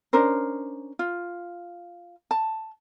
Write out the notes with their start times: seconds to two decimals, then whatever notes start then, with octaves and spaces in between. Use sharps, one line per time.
0.13 C#4 D4 A#4 C5
0.99 F4
2.31 A5